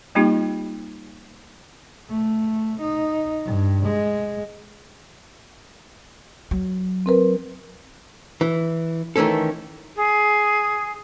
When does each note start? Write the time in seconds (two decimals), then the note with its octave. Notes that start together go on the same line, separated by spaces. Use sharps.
0.15 G3 A#3 C4 D#4 F4 G4
2.09 A3
2.81 D#4
3.45 G2
3.86 G#3
6.51 F#3
7.06 C4 A#4 B4
8.41 E3
9.16 D#3 E3 A3 C#4 A4
9.96 G#4